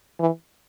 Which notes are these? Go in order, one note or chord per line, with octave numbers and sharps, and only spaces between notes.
E3